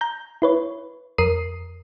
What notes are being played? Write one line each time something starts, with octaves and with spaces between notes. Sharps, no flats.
A#5 G6
E4 B4 C#5
F2 A#4 D#6 C7 D#7